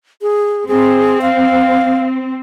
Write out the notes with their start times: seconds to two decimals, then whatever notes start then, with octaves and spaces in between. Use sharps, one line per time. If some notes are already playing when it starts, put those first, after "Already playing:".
0.22 G#4
0.68 C4 G#4
1.22 F5